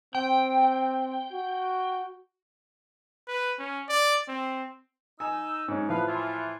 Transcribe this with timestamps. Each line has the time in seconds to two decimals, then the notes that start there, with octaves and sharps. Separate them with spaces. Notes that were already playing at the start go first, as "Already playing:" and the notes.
0.15 C4 G5
1.32 F#4
3.28 B4
3.59 C#4
3.88 D5
4.28 C4
5.20 D#4 G#5 E6
5.68 G#2 C#4
5.89 A2 F3 B4 F5
6.07 E3 F4